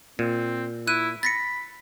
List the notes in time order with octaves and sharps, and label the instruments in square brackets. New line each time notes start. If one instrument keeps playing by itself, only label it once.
[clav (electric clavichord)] A#2 [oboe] C4
[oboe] E4 [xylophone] F#6 D#7
[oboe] B5 [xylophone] A6 A#6 C#7